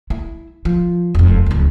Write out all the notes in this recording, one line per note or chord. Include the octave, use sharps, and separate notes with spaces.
E4
F3
E1 F2
D1 C#2